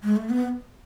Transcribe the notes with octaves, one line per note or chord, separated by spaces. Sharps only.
G#3
A3
B3